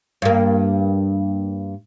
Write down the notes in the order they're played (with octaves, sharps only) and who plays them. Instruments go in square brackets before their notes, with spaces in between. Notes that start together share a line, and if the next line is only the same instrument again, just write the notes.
[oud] G2 A#3